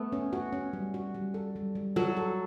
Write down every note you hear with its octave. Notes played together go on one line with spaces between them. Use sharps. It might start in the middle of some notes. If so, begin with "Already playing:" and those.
Already playing: A3 B3
C#4
F#4
C#4
G3
F#4
G3
A4
G3
G3
F#3 A4
A4